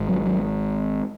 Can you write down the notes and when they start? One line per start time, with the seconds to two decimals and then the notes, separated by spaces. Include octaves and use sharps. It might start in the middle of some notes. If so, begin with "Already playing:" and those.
Already playing: G#1 G#2
0.09 F#3
0.26 F#3